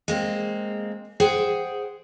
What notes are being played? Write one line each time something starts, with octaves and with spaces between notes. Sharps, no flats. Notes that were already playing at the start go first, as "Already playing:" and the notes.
G#3 A#3 C4
G#4 C5 F#5 G5